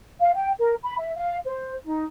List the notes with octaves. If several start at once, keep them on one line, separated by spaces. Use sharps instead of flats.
F5
G5
A#4
B5
E5
F5
C5
D#4